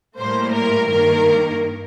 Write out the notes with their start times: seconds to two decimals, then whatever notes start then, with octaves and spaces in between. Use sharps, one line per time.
0.18 A2 G3 A#3 C5
0.53 A#4
0.89 G2 D#3 A#3 A#4